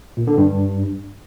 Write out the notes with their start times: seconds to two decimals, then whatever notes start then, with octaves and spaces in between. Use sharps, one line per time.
0.17 A#2
0.27 D3
0.38 G2